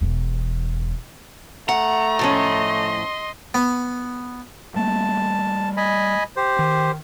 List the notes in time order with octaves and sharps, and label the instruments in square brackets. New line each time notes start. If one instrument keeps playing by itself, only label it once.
[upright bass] E1 E2
[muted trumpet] A3 [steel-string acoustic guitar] F#5 [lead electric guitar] A#5
[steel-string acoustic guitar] A2 F3 C#4 [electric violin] D#5 C6
[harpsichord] B3
[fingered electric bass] G3 A3 A#3 [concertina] A5
[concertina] D#5 G#5 B5
G4 C5
[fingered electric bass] D#3